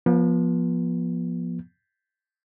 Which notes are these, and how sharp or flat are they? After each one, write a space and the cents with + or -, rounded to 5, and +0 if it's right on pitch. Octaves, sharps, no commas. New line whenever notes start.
F3 +0 B3 -35